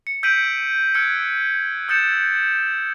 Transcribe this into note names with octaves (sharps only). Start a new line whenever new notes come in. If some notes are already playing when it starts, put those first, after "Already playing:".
C#7
E6 G6 B6 D7 D#7 F#7
E6 F#6 G#6 C#7 D7
D#6 E6 G6 A6 C#7 E7